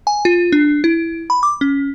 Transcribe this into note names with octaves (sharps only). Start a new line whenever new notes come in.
G#5
F4
D4
E4
B5
D6
C#4